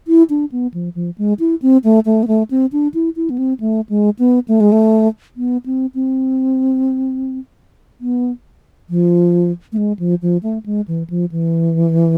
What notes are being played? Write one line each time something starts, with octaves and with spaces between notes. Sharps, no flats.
E4
D4
B3
F3
F3
G#3
E4
C4
A3
A3
B3
A3
C4
D4
E4
E4
B3
C4
A3
G#3
B3
A3
G#3
A3
B3
C4
C4
B3
F3
A3
G#3
F3
F3
A3
G#3
E3
F3
E3